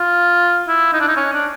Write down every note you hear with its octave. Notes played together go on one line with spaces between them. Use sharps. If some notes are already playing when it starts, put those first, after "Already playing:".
Already playing: F4
E4
D#4
D4
D#4
C#4
D4